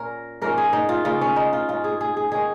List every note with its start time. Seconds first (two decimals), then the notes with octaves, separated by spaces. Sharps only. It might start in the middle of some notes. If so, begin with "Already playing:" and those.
Already playing: A#2 A#3 C#4 A#4 C#5
0.41 G#2 F3 A#3 C#4 A#4
0.58 G#4
0.73 D#4
0.89 F4
1.05 C#3 A#3 C#4 F4
1.21 C#4
1.36 D#4
1.53 F4
1.68 G#2 G#3 C#4 F4
1.84 G#4
2.01 G#4
2.17 G#4
2.31 D#3 A#3 C#4 G#4